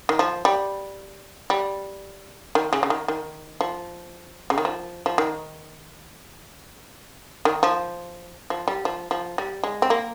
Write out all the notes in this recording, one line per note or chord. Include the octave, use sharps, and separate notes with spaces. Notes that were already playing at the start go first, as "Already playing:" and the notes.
D#3
F3
G3
G3
D#3
C#3
C#3
D#3
D#3
F3
C#3
D#3
F3
F3
D#3
D#3
F3
F3
G3
F3
F3
G3
G#3
C4
A#3